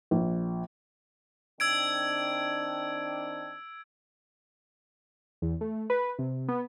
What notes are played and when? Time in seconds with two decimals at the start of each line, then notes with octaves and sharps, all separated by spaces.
0.11 A#1
1.60 D#3 C4 D4 E6 G#6 D7
5.42 E2
5.61 A3
5.90 B4
6.19 C3
6.48 B3